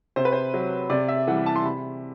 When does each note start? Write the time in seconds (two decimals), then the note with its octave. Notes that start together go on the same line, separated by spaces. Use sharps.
0.16 C3 C5
0.25 B4
0.33 C5
0.54 F#3
0.90 C3 D5
1.08 E5
1.27 E3 G3 F#5
1.46 A5
1.56 C6
1.64 C3 B5